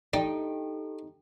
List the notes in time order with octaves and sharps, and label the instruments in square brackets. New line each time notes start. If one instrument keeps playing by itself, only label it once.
[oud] D#4 [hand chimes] G4 A4 [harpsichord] D5 [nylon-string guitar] G5